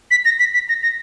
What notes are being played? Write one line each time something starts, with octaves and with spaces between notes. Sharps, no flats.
B6
A#6
B6
B6
A#6
A#6